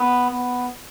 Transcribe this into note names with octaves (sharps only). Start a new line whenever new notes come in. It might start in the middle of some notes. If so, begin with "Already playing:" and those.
Already playing: B3
B3